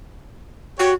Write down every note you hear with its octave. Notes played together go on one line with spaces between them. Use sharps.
F#4 G4 C#5